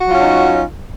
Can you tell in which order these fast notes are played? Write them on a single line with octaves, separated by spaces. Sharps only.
F#4 F#3 F4 C#4 D#4